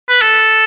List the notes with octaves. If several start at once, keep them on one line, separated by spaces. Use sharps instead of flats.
B4
A4